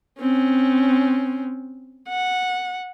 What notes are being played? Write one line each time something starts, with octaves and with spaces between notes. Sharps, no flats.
C4 C#4
F#5